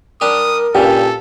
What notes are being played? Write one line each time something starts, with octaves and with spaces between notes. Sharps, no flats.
G3 D4 G4 A#4 D#6
G2 A#2 C#3 G4 A4